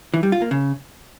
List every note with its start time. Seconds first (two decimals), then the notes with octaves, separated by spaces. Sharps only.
0.14 E3
0.23 G3
0.32 F4
0.42 A#3
0.51 C#3